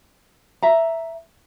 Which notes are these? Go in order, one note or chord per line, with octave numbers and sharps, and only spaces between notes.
E5 A#5